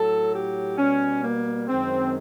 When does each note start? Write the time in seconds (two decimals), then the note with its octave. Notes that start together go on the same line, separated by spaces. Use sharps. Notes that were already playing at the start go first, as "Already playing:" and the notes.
Already playing: A2 F#3 A4
0.33 G4
0.78 B2 G3 C#4
1.23 A#3
1.68 F#2 D#3 G#3 C4